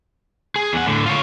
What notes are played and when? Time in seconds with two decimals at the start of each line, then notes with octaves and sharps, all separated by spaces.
0.56 G#4
0.73 E2 F#5
0.86 A2 D3
1.06 F4 C#5